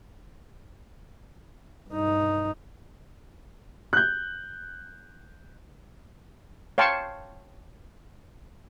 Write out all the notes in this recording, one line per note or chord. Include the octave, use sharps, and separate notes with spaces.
G2 D#4
F#6 G6
C#5 F5 G5 A5 C6 C#6